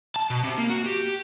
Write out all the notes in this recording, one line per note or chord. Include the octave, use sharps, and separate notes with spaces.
A5
B2
C3
A#3
F#4
G4